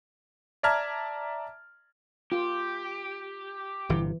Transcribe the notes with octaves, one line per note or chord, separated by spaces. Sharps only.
D5 E5 A5 A#5 F6 G#6
F4 G4
G1 C3 E3